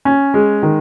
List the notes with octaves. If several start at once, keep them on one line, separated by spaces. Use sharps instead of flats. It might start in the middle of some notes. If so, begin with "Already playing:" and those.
C#4
G#3
D#3